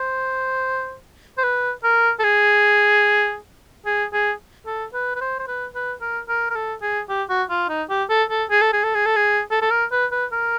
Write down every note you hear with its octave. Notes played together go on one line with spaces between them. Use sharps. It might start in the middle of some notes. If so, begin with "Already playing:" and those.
Already playing: C5
C5
B4
A#4
A4
G#4
G#4
G#4
A4
B4
B4
C5
C5
B4
B4
A#4
A#4
A#4
A4
G#4
G4
F#4
F4
D#4
G4
A4
A4
G#4
A4
G#4
A4
G#4
A4
G#4
A4
A4
A#4
B4
B4
A#4